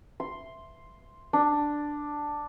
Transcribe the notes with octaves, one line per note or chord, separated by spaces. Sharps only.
C6
D4